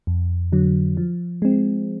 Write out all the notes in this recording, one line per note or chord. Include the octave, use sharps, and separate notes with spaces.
F2
D3 F#3
F3
G#3 C4